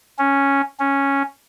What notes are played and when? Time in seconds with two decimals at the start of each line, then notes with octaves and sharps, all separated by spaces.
0.18 C#4
0.79 C#4